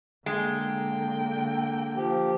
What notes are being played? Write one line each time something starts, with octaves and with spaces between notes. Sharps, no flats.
D3 G#3 A#3 G5
F3 G4